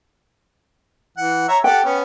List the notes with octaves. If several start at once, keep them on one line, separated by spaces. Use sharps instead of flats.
E3 F#5
C#5 E5 A#5
G4 A4 F#5 G5
B3 C#4